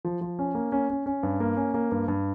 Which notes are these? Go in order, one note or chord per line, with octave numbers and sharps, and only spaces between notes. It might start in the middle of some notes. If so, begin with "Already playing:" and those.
F3
F3
C#4
A#3
C#4
C#4
C#4
G2
A#3
C#4
A#3
G2
G2